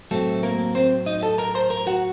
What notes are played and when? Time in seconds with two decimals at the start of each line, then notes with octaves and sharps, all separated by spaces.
0.11 A2 F#3 A3 C4 A4
0.43 A#3 A#4
0.75 C4 C5
1.06 D#4 D#5
1.23 A4 A5
1.38 A#4 A#5
1.55 C5 C6
1.70 A#4 A#5
1.87 F#4 F#5